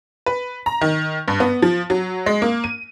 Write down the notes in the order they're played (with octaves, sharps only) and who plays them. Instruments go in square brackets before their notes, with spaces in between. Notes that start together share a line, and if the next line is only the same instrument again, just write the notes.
[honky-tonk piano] B4
A#5
D#3
G2
B3
F3
F#3
G#3
A#3
D#7